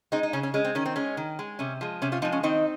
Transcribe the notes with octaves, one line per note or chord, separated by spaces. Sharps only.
G#3 C4 D#4
D#4
C#3 C#4
C#4
G#3 C#4
C4
D#3 C#4
C4
G#3 C#4
D#3
G#3
C3 C#4
F3 G#3
C3 C#4
C#4 F4
F3 G#3 C4 D#4
C#4
D#3 C4 D#4